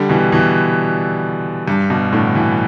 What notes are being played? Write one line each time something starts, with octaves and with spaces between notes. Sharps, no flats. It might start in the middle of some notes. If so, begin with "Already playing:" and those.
Already playing: D3 G3
B2 E3
B2 E3
G2
G2 B2
A2 D3
B2 E3